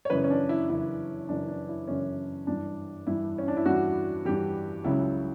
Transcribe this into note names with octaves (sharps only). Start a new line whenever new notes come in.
C#5
F#2 C#3 E3 B4
C#4
D4
E4
F#2 C#3 E3 E4
F#2 C#3 E3 D4
D4
E4
F#2 C#3 E3 C#4
G2 E3 D4
G2 E3 E4
C#4
D4
E4
G2 E3 F#4
G2 E3 G4
C#2 C#3 F#3 E4